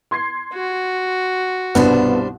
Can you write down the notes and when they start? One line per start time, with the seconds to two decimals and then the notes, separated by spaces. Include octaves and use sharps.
0.11 C6 G#6 C7
0.53 F#4
1.75 C2 G2 B2 G3 B3 D4 C5